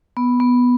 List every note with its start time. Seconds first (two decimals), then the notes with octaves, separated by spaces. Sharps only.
0.17 B3
0.40 B3